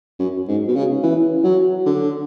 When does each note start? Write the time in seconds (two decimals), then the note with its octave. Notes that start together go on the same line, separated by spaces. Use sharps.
0.20 F#2
0.48 G#2
0.68 B2
0.76 C#3
1.03 E3
1.44 F#3
1.86 D3